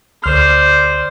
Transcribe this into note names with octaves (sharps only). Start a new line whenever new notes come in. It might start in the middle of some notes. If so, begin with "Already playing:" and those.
D2 C5 D5 F6